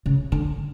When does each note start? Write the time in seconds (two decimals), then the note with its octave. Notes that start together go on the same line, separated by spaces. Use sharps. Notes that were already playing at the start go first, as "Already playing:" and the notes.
0.06 C#3
0.32 D3